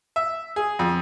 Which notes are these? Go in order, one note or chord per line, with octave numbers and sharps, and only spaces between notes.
E5
G#4
F2